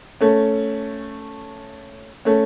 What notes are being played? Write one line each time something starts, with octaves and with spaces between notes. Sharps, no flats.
A3 C#4
A3 C#4